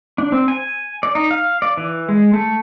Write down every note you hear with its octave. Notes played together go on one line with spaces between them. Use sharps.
D4
C4
G#5
D5
D#4
F5
D5
E3
G#3
A3